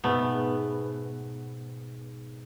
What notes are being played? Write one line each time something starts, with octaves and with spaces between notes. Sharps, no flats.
G#2 B2 A3 B3